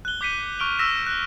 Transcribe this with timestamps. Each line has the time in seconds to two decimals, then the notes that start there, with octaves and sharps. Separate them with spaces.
0.05 F#6 G7
0.21 D6 G6 B6 C#7 D#7
0.59 C#6 F6 D7 F7 G7
0.79 E6 A#6 B6 E7
1.06 F#6